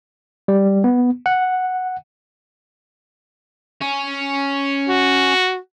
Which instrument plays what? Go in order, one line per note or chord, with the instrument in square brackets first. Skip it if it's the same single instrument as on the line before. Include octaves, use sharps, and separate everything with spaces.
[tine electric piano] G3
B3
F#5
[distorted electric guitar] C#4
[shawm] F#4